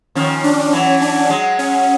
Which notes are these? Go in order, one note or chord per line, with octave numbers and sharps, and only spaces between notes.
D#3 F3 C#4
D4
E3 F#3 C#4
D4
F#3 G#3
C#4